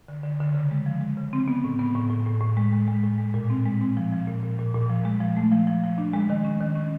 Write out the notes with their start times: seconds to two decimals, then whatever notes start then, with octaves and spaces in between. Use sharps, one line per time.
0.08 D3
0.24 D3
0.40 D3
0.54 C#3
0.71 G#3
0.86 F3
1.01 G#3
1.17 C#3
1.33 C4
1.48 B3
1.64 A2
1.79 B3
1.95 A2
2.10 A2
2.26 A2
2.41 A2
2.57 G#3
2.72 G#3
2.88 G#3
3.04 A2
3.18 G#3
3.34 A#2
3.50 C4
3.65 G#3
3.81 C4
3.97 F3
4.12 F3
4.27 A#2
4.43 A#2
4.59 A#2
4.74 A#2
4.90 F3
5.05 G#3
5.21 F3
5.37 A3
5.52 F3
5.67 F3
5.83 F3
5.98 D4
6.13 G#3
6.30 D#3
6.45 C#4
6.60 D#3
6.75 C#4